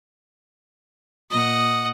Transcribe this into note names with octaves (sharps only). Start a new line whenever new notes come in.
A#2 D#5 F#5 D#6